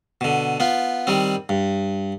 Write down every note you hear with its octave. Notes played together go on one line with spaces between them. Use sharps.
B2 D3
B3 F4
D#3 G3 C4
G2